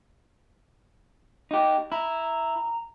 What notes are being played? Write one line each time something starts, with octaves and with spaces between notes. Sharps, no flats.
D#4 G4
E4 A#5